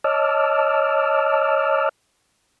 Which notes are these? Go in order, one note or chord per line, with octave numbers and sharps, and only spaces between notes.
C#5 D#5 A5 D6 E6 F6